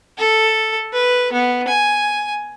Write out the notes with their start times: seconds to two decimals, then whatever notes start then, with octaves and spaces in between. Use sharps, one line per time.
0.18 A4
0.93 B4
1.32 B3
1.68 G#5